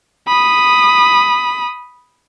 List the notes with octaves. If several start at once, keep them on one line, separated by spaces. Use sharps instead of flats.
B5 D#6